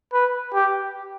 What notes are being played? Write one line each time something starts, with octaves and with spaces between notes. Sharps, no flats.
B4
G4